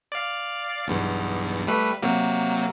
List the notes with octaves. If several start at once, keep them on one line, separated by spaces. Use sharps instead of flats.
D5 F5
B1 E2 G2
G3 A3 B4
C3 F#3 A#3